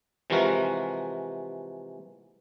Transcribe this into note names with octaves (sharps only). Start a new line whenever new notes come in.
C3 E3 F3 G#3 F#4 A#4